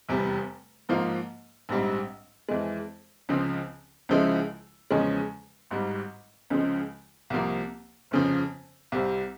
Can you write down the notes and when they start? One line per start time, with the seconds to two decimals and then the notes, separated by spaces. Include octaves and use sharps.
0.09 F1 E2 C3 G3
0.89 G#2 F3 A#3 F4
1.69 A#1 G#2 G3 C4
2.49 F2 E3 G#3
3.29 C#2 C#3 F3 C4
4.09 C#2 C#3 F3 G#3 E4
4.91 E2 C#3 F3 G#3 C#4
5.71 G#1 G#2 G3
6.50 C#2 C#3 F3 G#3
7.30 C2 C3 F3 A#3
8.11 G1 F2 C#3 F3
8.92 C2 C3 G3 C4